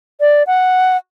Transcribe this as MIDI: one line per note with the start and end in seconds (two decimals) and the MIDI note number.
0.20 0.43 74
0.47 0.97 78